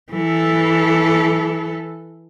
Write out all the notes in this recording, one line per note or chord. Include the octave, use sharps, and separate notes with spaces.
E3 A4